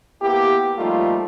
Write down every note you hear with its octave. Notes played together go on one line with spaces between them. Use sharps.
A#3 B3 E4 G4
F3 G3 A3 A#3 D#4 F4